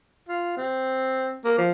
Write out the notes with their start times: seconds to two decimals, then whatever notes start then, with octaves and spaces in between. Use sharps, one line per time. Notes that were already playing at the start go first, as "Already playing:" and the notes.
0.29 F4
0.57 C4
1.45 A#3
1.58 F3